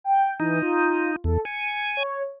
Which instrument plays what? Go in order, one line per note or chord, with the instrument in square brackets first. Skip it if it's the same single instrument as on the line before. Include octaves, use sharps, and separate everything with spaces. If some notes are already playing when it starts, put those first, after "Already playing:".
[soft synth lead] G5
[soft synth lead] E3 [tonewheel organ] D#4
[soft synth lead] F4
[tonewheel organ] E2 [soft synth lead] A4
[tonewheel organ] G#5 [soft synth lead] C#7
[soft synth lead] C#5